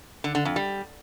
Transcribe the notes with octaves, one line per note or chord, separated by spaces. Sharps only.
D3
D3
F2
G3